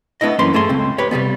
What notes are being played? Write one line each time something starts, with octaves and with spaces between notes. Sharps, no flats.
A3 B3 D4 E4 D#5
F#2 E3 A#3 C#4 B4 C6
G2 A3 G#4 C6
C#2 C4
G4 B4 C#5
C3 E3 G3 B3